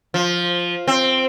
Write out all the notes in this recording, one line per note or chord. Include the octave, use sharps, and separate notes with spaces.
F3
C4